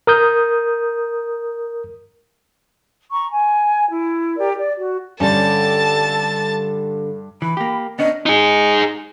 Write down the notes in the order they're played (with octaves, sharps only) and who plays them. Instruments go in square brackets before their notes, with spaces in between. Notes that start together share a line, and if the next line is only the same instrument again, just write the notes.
[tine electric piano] A#4 D#6 G6
[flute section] A#5 C#6
G#5
E4
G4 A#4 D5
D5
F#4
[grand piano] G2 [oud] D3 G3 C#4 [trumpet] A4 [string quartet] A5 A6
[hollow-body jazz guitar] E3 [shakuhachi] B5
[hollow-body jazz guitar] A#3 G4
[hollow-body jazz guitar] B3 C#4 D4 [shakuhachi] D#5
[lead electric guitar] D#4 G#4